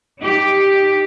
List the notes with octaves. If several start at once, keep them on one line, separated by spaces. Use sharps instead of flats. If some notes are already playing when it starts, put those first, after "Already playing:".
D#4 G4